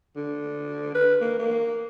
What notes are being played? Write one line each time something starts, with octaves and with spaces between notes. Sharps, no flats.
D3
B4
A#3
A#3